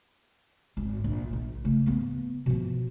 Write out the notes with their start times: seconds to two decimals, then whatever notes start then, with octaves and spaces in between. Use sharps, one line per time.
0.77 G#1
1.04 A#1
1.33 A#1
1.64 C#3 A3
1.86 A#3 B3
2.46 B2 F3